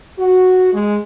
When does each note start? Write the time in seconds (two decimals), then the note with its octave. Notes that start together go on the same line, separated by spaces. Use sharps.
0.19 F#4
0.74 G#3